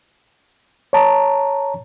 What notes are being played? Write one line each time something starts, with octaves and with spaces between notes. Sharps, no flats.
C#5 A5 A#5